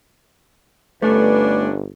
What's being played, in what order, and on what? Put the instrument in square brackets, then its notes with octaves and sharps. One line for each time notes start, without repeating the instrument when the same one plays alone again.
[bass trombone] G1 [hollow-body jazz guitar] A3 [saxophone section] C#4 D4 [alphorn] B4